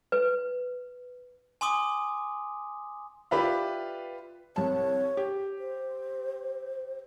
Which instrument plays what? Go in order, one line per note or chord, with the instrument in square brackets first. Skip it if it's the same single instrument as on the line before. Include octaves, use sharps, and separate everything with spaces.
[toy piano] B4
[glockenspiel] G#5 C6 D6 D#6
[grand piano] F4 G4 B4 D5 E5 F5
[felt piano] C2 A5 [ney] C#5
[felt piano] G4
[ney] C5